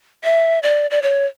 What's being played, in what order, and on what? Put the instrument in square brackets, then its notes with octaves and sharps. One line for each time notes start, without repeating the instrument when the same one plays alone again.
[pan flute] E5
D5
D5
C#5